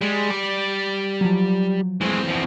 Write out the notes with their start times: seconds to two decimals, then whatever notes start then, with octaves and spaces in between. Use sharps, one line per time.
0.01 G3 G#3
0.31 D5
1.21 F3 F#3
2.01 E3 G#3 A3 C4
2.28 E2 F3